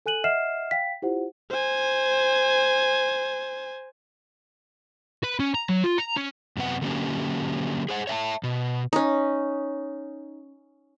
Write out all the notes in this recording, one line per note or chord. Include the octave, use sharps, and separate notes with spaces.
A4 G#5 F#6 D#7 F#7
D#5 E5 F#5 F6 C7 E7
F5 G5 B6
E4 F4 G4 C5 F#5
C5 G#5
B4
C#4
A#5
F#3
F4
A#5
C#4
F#2 C3 B3 F#5
D3 F#3 A#3 C#4 G4
G#4 C5 F#5
C#5 E5 G5 A5
B2
C#4 D#4